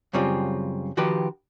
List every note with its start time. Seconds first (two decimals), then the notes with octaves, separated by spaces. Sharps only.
0.13 F#2 C#3 G3 C4 F4
0.97 D#3 F3 F#4 G4 B4